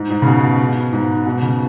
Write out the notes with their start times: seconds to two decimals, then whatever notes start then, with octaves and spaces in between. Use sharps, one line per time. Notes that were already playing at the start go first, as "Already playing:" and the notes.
Already playing: G#2
0.10 G#2
0.22 C#3
0.27 B2
0.93 G#2
1.26 B2
1.42 C#3